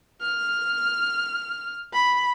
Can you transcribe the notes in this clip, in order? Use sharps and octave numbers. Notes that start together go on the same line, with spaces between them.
F6
B5